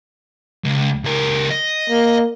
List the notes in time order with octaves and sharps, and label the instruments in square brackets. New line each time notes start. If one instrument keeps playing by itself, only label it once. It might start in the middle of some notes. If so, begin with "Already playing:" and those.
[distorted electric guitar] C#2
C#2 A#4
D#5
[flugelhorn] A#3